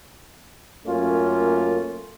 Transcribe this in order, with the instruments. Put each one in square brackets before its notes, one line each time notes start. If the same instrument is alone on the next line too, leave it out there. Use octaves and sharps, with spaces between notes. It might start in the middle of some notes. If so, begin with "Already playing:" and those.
[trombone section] F#2 A3 A#3 C#4 F4